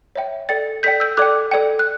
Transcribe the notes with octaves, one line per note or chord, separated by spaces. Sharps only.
C#5 E5 G5
A4 D5 G5 A6 C#7
A4 D5 G5 G6 B6
E6 G6
A4 D5 G5 D6 F#6
A4 D5 G5
F#6